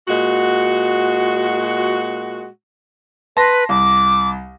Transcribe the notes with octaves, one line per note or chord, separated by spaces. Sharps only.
A#2 G#3 F#4
B4 A5 C6 A#6
C2 D6